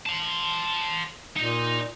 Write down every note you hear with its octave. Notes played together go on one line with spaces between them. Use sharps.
A5 C6
A#2 D#4